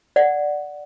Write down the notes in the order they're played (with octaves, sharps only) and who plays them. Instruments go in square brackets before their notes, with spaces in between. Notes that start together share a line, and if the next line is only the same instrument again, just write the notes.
[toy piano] D5 F#5